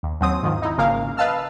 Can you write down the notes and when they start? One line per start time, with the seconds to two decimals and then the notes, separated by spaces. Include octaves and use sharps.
0.03 D#2
0.21 D#2 F#3 C4 D#6
0.43 G#2 D#3 F3
0.62 D#4 E4
0.78 G#1 C#3 F3 A#3 A#4 F5
1.17 B4 D#5 F5 A5 E6 F6